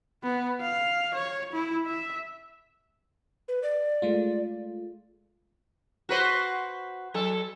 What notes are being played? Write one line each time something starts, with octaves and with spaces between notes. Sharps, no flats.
B3
F5
C#5
E4
E5
B4
D5
G#3 A3 F4
F#4 B4 C5
F#3 A4